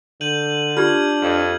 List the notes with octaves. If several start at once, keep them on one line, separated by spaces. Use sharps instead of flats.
D3 G6 D#7 F#7
D4 F4 G4 F6 G#6 F#7
F2